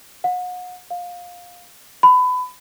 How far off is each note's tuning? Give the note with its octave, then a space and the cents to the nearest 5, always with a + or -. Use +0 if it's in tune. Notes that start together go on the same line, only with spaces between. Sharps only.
F#5 -35
F5 +20
B5 +25